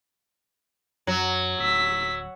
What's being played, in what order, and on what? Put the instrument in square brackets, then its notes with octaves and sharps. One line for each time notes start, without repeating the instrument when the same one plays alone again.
[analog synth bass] F#2 [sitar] F#3
[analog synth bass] D1 [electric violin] E6 B6